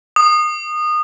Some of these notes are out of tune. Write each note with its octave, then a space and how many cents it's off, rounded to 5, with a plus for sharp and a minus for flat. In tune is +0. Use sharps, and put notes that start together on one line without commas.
D#6 -25